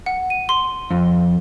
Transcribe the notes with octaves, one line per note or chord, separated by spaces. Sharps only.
F#5
D#7
C6
F2